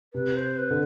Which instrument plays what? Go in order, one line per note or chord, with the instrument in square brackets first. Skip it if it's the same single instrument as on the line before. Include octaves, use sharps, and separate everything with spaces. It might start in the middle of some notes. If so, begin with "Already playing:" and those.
[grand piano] C3 [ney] B4
[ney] C5
B4
[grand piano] D3